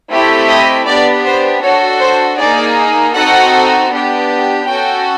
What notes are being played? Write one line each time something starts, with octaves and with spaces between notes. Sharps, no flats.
A3 C4 E4 G4
D#5
B3 D4 G4 D5
C5
D4 F#4 A4 C#5
C5
A#3 D#4 G#4 D5
C4 D#4 F#4 A4 F#5
B3 D4 G4
C#4 F#4 A4 G5